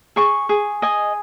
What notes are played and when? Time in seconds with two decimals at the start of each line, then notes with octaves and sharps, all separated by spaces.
0.16 G#4 C#6
0.49 G#4
0.82 D#5 G#5